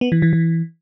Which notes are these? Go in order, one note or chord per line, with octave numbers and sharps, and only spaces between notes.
B3
E3
E3
E3